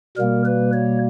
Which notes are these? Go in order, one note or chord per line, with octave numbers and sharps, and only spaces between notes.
B2 G3 A#3 A#4
B4
C#5